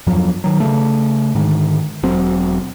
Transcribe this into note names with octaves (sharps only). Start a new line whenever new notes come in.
E2 G2 F3 F#3
D#3 F#3
C#3 A3
G#2 D3 D#3
E1 F#3 C4